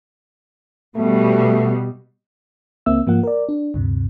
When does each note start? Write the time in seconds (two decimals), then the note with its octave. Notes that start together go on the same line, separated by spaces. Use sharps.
0.96 B2 G3 A3
2.86 C#2 A#3 C4 E5 E6
3.07 G#2 F3 A#3 F#5
3.23 A#4 D5
3.49 D4
3.74 D2 G2 C3